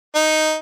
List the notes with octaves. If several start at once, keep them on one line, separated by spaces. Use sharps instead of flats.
D#4